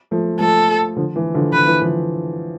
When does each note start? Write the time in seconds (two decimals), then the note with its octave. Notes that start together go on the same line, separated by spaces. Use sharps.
0.11 F3 A3
0.39 F3 A3 A4
0.96 D3 F3
1.16 E3
1.34 D3 F3
1.53 D3 B4
1.67 E3
1.82 D3 F3